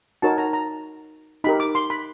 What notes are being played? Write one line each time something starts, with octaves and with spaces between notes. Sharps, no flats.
D#4 F#4 A#4 C#5 A5
A#5
A#5
D#4 G4 A#4 B5
D6
C6
B5